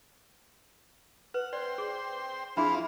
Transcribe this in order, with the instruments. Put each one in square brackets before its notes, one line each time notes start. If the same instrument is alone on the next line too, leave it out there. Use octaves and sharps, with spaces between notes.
[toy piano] B4 [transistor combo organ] F#5
[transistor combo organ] C5 G5 [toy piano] D5
[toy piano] G#4
[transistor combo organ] F3 C4 F4 [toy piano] D4 G#4 [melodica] E4